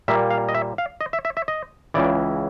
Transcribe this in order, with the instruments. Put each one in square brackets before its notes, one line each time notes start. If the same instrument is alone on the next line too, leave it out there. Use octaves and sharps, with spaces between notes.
[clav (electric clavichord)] A#2 G3 A#3 E5
F5
D#5
E5
F5
D#5
E5
E5
E5
D#5
C#2 C#3 E3 D5